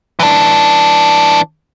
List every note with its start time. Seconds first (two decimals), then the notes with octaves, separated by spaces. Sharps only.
0.20 E3 D4